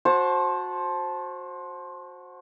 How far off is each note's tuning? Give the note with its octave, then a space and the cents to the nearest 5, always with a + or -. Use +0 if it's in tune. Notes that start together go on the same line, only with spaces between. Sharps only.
F#4 -20 C5 +15 A5 -10